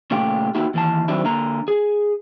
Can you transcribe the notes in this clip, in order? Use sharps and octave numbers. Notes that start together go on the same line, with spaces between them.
A#2 C#3 A3 F4 G4
A#3 D#4 E4 F#4 G4
D#2 E3 A5
D#3 F#3 G3 C4 D4 E4
D3 A#3 A#5
G#4